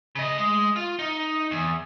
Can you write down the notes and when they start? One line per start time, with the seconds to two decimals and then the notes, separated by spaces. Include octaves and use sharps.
0.15 C#3 D#5
0.38 G#3
0.76 F4
0.99 D#4
1.51 E2